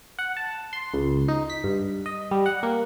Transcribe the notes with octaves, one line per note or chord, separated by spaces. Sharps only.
F#5
A5
C6
C#2
D#4
B6
G2
D#5
G3
F#5
A#3